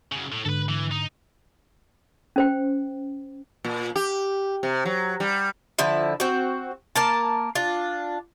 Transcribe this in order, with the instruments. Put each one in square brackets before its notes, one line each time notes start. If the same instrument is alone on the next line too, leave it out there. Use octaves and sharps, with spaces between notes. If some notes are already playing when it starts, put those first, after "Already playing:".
[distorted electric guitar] F#2 C#3
A2
[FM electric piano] G#2 D3 [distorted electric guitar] A4 B4
[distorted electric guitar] E3
D#4
[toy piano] C#4 C5 G5
[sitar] A#2
G4
C3
F#3
G3
[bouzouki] D3 F3 E4
C4 F#4
A#3 A#4 A5
D4 F4